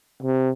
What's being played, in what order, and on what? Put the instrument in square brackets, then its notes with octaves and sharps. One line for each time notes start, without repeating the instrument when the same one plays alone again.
[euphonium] C3